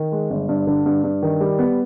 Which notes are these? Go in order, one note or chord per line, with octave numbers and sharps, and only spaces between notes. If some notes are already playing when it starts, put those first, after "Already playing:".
Already playing: D#3
G#3
G1
G2
D3
G2
G2
D#3
G3
B3